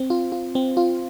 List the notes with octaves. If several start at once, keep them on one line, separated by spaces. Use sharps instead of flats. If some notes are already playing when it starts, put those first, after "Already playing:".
Already playing: C4
F4
F4
C4
F4